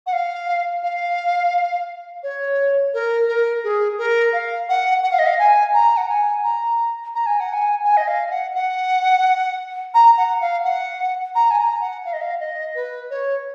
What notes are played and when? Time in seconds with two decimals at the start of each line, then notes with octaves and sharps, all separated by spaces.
0.07 F#5
0.13 F5
0.83 F5
2.23 C#5
2.94 A#4
3.28 A#4
3.64 G#4
3.98 A#4
4.33 F5
4.69 F#5
5.03 F#5
5.12 F5
5.19 D#5
5.27 F5
5.39 G#5
5.74 A#5
5.97 F#5
6.09 G#5
6.44 A#5
7.15 A#5
7.26 G#5
7.40 F#5
7.53 G#5
7.84 G#5
7.97 D#5
8.08 F5
8.30 F#5
8.55 F#5
9.94 A#5
10.17 F#5
10.41 F5
10.65 F#5
11.35 A#5
11.51 G#5
11.59 A#5
11.81 F#5
12.05 F5
12.13 D#5
12.21 F5
12.40 D#5
12.75 B4
13.10 C#5